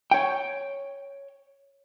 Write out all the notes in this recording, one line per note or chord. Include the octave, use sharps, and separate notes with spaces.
C#5 G5